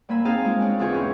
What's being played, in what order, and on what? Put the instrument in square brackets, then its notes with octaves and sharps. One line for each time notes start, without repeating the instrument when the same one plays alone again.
[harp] G2 A#3 G#5 B5 E6
C4 D#4 G#4 F5 G#5 A5
G#3 F4
C#4 D4
E2 D3 F4 G4 G#4 C#6
G#2 C#4 E4